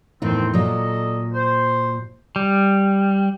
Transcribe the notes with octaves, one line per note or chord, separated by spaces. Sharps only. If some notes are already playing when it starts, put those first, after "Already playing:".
E2 A2 D#3 F3 C4 D#4
A#2 F#3 A4 D5 D#5
C5
G3